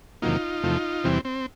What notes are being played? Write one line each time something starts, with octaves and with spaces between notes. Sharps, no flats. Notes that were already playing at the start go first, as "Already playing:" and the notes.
E2 C3 D#3 F#3 A#3 D#4 F4
E2 C3 F3 A3
E2 C3 E3 G3 C4
C4